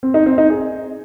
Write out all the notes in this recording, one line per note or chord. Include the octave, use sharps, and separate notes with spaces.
C4
D#4
C4
D#4
G#4